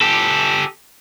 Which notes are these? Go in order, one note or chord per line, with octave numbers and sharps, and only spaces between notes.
G4 A4